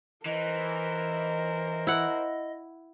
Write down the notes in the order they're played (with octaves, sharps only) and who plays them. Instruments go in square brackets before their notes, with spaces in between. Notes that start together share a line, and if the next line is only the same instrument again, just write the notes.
[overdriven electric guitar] E3 [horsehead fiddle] A#4 C5 [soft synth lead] D#5
[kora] E4 F#5